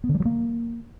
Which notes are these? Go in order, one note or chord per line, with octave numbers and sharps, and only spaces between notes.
B3
D3
G3
F#3
A#3